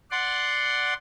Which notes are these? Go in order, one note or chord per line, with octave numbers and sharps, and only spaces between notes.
D5 F#5 C6